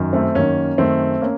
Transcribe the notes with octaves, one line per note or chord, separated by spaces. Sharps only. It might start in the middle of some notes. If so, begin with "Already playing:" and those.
Already playing: F#2 D#3
A3 C4
F#2 D#3 A#3 C#4
F#2 D#3 A3 C4
A#3 C#4